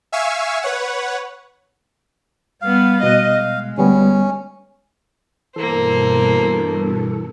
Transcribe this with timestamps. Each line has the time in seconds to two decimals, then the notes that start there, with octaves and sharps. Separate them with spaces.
0.12 E5 F5 G#5 C#6 E6
0.62 B4 C#5 F#5
2.62 G3 B3 F5
3.03 B2 D#5 F#6
3.37 G#3
3.78 D2 G3 B3 C#4
5.56 G2 B2 E3 A#3 A4 C5